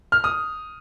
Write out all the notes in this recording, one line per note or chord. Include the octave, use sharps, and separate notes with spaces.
F6
D#6